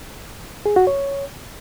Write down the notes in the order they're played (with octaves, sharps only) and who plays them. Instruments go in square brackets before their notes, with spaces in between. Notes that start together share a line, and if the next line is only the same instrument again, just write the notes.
[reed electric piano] G#4
F#4
C#5